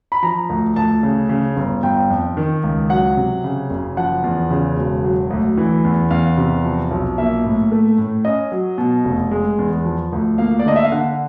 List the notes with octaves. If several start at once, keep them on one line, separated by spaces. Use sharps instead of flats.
B5
F3 A#5
D2
D2 A5
C#3
C#3
G1
G1 G5
F2
D#3
C#2
F#3 F#5
C3
C#3
F#1
F3 F#5
E2
C#3
E1
F#3
D2
E3
E2
E2 F5
C3
F3
B1
A#3 E5
A2
A3
A2
C#4 D#5
F#3
B2
F1
G#3
E2
F3
D2
A#3 F5
D5
D3 D#5
E5
F5
D3 F#5